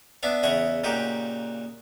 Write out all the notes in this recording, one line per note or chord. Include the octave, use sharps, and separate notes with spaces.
B3 D4 E5 F5
E2 C#3 E4 D#5 F#5 C#6
A#2 C#3 D#4 F#4 G4